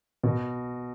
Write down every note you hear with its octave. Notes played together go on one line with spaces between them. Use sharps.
B2